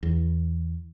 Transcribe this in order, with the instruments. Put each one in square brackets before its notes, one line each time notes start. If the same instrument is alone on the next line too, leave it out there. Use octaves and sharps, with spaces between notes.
[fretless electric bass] E2